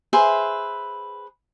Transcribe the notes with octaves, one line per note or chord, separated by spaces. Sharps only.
G#4 B4 C5 E5